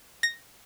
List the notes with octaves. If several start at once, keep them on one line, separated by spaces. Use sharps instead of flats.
A#6